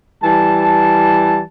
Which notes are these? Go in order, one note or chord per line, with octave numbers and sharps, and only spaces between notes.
E3 G3 A5